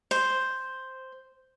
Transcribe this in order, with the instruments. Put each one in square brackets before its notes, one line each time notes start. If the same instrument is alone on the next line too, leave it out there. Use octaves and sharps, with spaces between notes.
[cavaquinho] C5